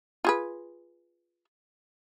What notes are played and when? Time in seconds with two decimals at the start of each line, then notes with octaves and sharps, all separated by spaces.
0.24 F4 G#4 B4